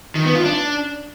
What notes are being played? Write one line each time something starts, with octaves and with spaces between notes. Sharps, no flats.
D#3
B3
F4
D4